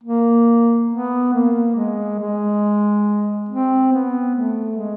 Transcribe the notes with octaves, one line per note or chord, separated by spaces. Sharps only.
A#3
B3
A#3
G#3
G#3
C4
B3
A3
G#3